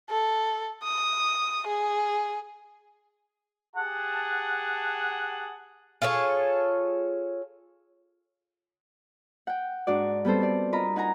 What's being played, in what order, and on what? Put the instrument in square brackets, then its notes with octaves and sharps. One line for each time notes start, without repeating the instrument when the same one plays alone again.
[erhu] A4
D#6
G#4
[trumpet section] G4 G#4 A5 [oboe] F#5
[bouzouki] F4 G#4 A4 C#5
[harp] F#5 G5
G#2 D4 F#4 D5
G3 B3 C4 A4 C5
G4 D5
F4 A#4 D#5 A#5 B5
D#4 F#5 G#5 A#5